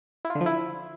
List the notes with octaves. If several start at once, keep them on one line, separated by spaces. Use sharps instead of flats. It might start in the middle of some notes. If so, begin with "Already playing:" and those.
E4
F4
D3
F3
E4